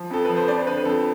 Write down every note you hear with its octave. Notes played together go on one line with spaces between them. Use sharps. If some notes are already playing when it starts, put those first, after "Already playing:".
Already playing: F3
F2 A4
F3 B4
C5
F2 D5
C5
D3 B4
B4
F2 A4